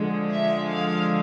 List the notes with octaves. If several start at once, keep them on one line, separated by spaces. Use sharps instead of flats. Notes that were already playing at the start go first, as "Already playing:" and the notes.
Already playing: D3 F3 G#3
E5
F5